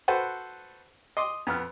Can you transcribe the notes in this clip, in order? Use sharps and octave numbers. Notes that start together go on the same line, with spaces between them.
F#4 A4 B4 C5 F#5
D#5 C6 D6
F2 B3 F6